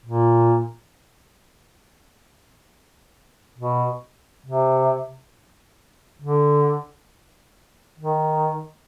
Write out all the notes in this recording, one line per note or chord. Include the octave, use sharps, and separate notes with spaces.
A#2
B2
C3
D3
D#3